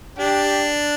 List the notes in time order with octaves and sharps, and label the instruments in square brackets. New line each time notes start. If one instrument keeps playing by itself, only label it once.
[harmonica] D4 [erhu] G4